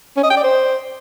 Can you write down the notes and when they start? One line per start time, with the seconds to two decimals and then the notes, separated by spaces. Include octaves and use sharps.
0.16 C#4
0.23 D#5
0.30 G5
0.37 D5
0.43 C5